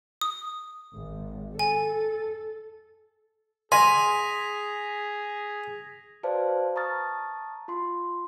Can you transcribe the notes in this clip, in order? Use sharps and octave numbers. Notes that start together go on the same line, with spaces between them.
D#6
G#1
A4 G#5
G#4 G#5 C6 A#6 B6 F7
F#4 B4 C5 D5 F5 A5
A5 A#5 C#6 D#6 F6 A6
F4 C6